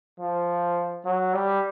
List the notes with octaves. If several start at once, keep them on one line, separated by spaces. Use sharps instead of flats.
F3
F#3
G3